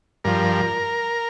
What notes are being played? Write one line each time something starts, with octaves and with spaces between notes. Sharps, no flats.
G2 F3 A#4